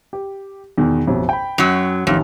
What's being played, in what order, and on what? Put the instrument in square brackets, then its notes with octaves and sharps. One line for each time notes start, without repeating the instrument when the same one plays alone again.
[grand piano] G4
E2 B2 D#3
A1 F2 B2
G5 B5
[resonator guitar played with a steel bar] F#2 F#3
[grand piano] A1 D#3 [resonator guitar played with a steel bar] F2